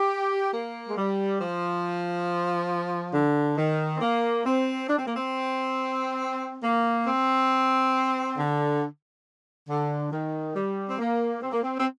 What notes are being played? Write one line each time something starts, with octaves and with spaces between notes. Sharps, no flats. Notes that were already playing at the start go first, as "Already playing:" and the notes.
Already playing: G4
A#3
G#3
G3
F3
D3
D#3
C4
A#3
C4
D4
C4
A#3
C4
A#3
C4
D3
D3
D#3
G3
C4
A#3
C4
A#3
C4
C4